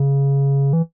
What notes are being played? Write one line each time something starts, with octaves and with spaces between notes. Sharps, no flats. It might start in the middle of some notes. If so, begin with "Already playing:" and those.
Already playing: C#3
E3